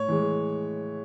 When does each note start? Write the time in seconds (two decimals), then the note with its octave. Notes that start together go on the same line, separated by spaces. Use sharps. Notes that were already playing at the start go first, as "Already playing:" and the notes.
Already playing: A2 C#5
0.09 E3 G#3